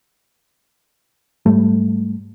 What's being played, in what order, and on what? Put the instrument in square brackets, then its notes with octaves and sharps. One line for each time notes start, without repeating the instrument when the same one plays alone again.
[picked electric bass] G#2 G3 A3